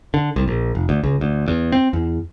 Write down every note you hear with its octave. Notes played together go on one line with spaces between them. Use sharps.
D3
C2
A#1
F1
D2
C#2
D2
E2
C4
E2